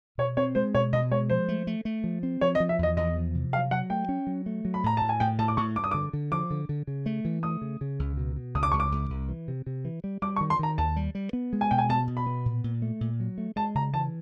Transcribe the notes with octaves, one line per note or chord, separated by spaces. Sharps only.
B2 C#5
C4 C#5
G#3 C5
B2 C#5
B2 D#5
G#3 C#5
F3 C5
A3
A3
A3
F3
C4
F3 C#5
D#5
F3
E5
E2 D#5
E2 D#5
F3
C3
F#3 F5
F#3 F#5
A3 G5
C#4
F#3
A3
F#3
B5
A2 A#5
A2 A5
G#5
A2 G5
A2 A5
D6
A2 C#6
G2 D6
D#6
D3 D6
D3
F3 D6
D3
D3
C#3
A3
E3
A3 D#6
C#3
C#3
C#2
B2
B2
C#2 D#6
D6
C#2 C#6
D6
C#2
C2
E3
C3
C3
E3
G3
G3 D6
C#6
D#3
C6
D#3 A#5
D#2 A5
G3
G3
B3
G#3
G#5
B2 G5
G#5
B2 A5
B2
B5
B3
A#2
A#2
A3
A#2
F#3
A3
G#3 A5
C#3 A#5
E3 A5